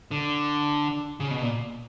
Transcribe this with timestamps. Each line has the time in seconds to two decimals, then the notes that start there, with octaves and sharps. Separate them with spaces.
0.11 D3
1.20 C#3
1.31 B2
1.42 A#2